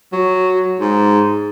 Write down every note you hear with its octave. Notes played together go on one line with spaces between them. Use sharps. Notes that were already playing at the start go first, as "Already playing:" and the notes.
F#3
G#2